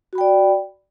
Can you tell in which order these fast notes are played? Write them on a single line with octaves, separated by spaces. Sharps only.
F#4 B5 G5 D5